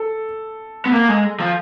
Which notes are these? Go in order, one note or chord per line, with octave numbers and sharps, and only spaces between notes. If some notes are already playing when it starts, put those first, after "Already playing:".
Already playing: A4
B3
A#3
G#3
F3